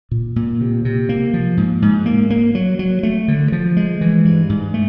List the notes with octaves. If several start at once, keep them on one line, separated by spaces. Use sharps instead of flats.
A#2
A#2
C3
C3
A#3
F3
G#2
G#2
A#3
A#3
F#3
F#3
A3
D3
F3
G#3
E3
G2
G#2
A3